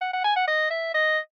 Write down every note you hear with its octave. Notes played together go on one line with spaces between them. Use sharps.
F#5
F#5
G#5
F#5
D#5
E5
D#5